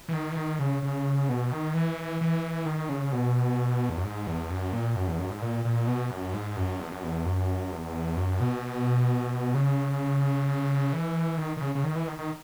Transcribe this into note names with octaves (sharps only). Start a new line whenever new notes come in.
E3
D#3
E3
D#3
C#3
C#3
B2
D#3
E3
E3
D#3
C#3
B2
E2
F#2
G#2
E2
F#2
A#2
F#2
E2
F#2
G#2
A#2
A#2
B2
F#2
G#2
F#2
E2
F#2
E2
F#2
E2
F#2
B2
C#3
E3
D#3
D#3
C#3
C#3
D#3
E3
D#3
D#3